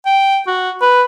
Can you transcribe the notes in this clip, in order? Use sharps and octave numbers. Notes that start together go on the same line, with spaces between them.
G5
F#4
B4